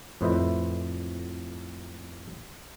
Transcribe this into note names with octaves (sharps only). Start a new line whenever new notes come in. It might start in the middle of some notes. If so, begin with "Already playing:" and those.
F2 A2 B4 C5 D#5 E5